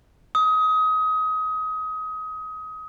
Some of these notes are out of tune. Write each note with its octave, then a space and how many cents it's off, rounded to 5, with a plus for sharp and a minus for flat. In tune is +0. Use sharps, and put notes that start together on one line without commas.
D#6 +25